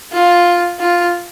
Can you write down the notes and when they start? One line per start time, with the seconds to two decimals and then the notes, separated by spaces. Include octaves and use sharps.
0.12 F4
0.80 F4